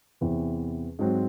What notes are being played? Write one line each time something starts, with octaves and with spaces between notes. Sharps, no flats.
E2 C3 E3 C4
G#2 F#3 C4